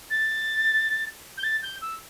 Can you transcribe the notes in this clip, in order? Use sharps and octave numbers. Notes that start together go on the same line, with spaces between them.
A6
G6
A6
G6
E6